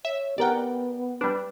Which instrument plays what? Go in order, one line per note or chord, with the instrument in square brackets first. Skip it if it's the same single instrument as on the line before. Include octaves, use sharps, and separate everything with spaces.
[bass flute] C#5 [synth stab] E5
[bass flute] B3 [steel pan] G4 A#4 F#5 [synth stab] D5 G5
[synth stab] G3 D4 [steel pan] B4